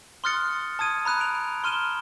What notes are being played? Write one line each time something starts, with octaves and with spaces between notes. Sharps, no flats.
C6 D#6 F6 F#6 A6 C#7
A5 D#6 G#6 D#7
A#5 B5 F#6 D#7
D7 F7
C6 F6 D#7 E7 G7